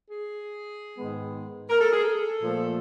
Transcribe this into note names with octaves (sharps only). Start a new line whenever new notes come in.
G#4
G#2 D#3 G#3 B3
A#4
A4
G#4
A4
A#2 F3 A3